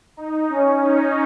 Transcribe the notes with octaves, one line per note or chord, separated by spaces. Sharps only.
D#4
C#4
D#4